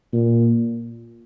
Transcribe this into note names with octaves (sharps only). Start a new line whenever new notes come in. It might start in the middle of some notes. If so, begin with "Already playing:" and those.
A#2